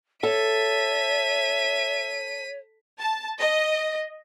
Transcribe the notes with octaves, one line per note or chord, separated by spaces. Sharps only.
A4 C#5 E5 B6 D#7
A5
D#5